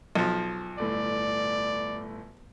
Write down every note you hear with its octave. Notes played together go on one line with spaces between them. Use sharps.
B1 F3
G1 A2 D5